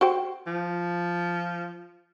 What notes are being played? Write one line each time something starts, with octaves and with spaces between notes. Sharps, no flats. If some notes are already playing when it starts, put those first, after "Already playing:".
F#4 C5 G5
F3